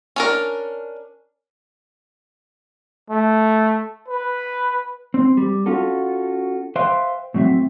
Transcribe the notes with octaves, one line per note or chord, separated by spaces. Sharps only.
C#4 D4 A#4
A3
B4
C4
G3
C#4 F4 F#4 A4
B4 C5 E5 F5 G5 C6
A2 F#3 C4 E5